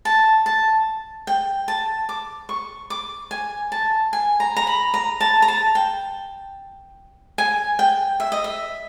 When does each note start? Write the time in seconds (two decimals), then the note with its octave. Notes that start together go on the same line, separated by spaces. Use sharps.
0.05 A5
0.46 A5
1.27 G5
1.68 A5
2.09 D6
2.49 C#6
2.90 D6
3.31 G#5
3.72 A5
4.13 G#5
4.40 A#5
4.56 A#5
4.67 B5
4.94 A#5
5.21 A5
5.42 A#5
5.48 A5
5.75 G5
7.38 G#5
7.79 G5
8.20 E5
8.32 D#5
8.44 E5